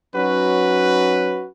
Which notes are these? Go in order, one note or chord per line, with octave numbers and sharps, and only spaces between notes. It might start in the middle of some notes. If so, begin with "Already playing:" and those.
F#3 C#4 D#4 F#4 B4